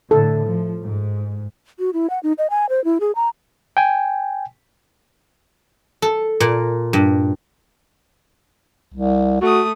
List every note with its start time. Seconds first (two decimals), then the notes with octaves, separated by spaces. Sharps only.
0.11 A2 D3 A4
0.46 F3
0.84 G#2
1.79 F#4
1.94 E4
2.10 F#5
2.23 D#4
2.38 D#5
2.50 G#5
2.69 C5
2.85 E4
3.00 G#4
3.15 A#5
3.77 G5 G#5
6.02 A4
6.40 A#2
6.93 G2
8.94 C2
9.41 A3 F#4 D#6